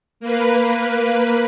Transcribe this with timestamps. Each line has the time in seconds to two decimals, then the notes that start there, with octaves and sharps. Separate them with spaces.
0.20 A#3 B4